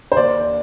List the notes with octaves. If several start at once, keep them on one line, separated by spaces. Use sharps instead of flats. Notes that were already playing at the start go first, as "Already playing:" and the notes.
C5
D#2 D5